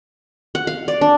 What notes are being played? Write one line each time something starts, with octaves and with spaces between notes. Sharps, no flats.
F#5
F5
D5
D4